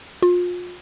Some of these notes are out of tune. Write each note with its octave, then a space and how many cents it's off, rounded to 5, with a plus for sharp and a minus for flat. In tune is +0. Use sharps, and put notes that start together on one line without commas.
F4 +30